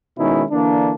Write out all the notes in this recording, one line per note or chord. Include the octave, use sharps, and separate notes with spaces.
B2 D#3 G#3 C#4 D#4 E4
D3 E3 A#3 D4